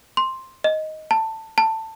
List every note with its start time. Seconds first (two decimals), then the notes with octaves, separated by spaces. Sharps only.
0.17 C6
0.64 D#5
1.11 A5
1.58 A5